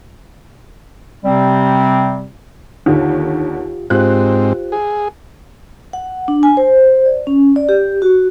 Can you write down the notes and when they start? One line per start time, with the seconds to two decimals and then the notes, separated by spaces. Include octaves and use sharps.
1.25 C3 G3 C4
2.86 D#2 D3 D#3 F4 G4
3.90 G#2 C4 F4 G4 C5 F#6
4.72 G#4
5.93 F#5
6.28 D4
6.43 G#5
6.57 C5
7.05 D5
7.27 C#4
7.56 D5
7.69 G4
8.02 F#4